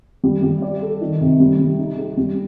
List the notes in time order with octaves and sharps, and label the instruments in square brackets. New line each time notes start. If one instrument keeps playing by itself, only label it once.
[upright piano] G3
G3
D5
A4
D#3
C3
G3
G3
D#4
G4
G3